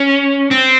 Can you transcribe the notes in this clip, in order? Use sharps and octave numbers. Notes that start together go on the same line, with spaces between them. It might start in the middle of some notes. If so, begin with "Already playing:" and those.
Already playing: C#4
C4